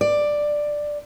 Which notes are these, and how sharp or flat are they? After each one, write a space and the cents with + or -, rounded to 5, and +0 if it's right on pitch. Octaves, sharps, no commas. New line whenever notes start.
D5 +5